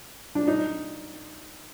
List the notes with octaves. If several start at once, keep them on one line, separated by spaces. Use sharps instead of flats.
D4
D#4